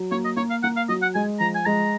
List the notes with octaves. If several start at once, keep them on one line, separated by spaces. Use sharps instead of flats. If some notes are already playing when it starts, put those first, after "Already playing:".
Already playing: F#3
A#3 C#5
D#5
A#3 C#5
F5
A#3 F#5
F5
F#3 D#5
F#5
G#3 G#5
F3 A#5
G#5
G#3 A#5